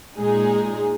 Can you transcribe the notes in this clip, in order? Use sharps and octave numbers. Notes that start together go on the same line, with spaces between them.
A#2 G#3 D#4 G#4